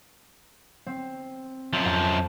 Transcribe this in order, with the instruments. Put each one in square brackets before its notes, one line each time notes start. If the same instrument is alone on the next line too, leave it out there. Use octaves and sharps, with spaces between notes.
[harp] C4
[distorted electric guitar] F#2 F3
[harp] F2